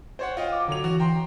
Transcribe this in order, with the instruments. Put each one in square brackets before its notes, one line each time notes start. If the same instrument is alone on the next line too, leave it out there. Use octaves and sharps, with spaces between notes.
[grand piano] C5 C#5 F#5
F4 D#5 G5
[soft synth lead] D6
[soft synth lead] D3 [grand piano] F#3 C#5 F7
[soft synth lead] E3 [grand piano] F#4
[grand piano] G5 A#5 C6